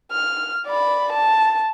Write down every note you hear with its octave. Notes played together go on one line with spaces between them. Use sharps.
F6
D5 B5
A5